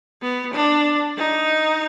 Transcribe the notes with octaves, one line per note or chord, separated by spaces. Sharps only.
B3
D4
D#4